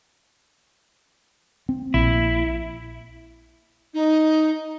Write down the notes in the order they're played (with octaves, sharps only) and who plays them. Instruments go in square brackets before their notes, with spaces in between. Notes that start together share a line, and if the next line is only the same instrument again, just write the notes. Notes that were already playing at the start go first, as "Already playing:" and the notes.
[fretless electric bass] C4
[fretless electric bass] A#1 [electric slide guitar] E4
[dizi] D#4